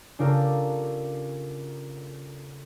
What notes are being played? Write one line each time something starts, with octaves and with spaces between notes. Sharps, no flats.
C#3 D4 F4 G4 A4 A#4